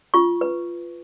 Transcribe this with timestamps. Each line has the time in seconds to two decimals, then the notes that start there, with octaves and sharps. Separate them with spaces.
0.14 F4 C#6
0.41 B4